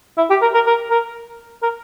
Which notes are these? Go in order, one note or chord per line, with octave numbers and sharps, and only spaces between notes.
E4
G4
A#4
A#4
A#4
A#4
A#4